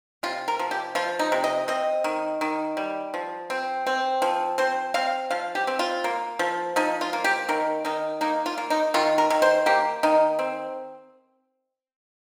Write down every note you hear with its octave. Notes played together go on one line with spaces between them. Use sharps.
C3 F4
A#4
F3
G4
F3 F4
D#4
C3
D#5
C4 D#5
D#3
D#3
G3
F3
C4
C4
F3
C4 C5
C4 F5
F3 F5
G4
C4
F4
A#3
F3
F3 D#4
F4
A#3
G4
D#3 A#4
D#3 D#4
A#3 D#4
F4
A#3
D#4
D#3 F4
A#4
D#3
C5
A#3 G4
D#3 D#4
C4